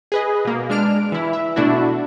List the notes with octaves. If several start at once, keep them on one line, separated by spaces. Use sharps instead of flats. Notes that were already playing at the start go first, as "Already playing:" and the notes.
G#4 B4 D#5
B2 A#3
G#3 D4 F6 D7
E3 E4
E5
B2 A3 D4 E4 F#4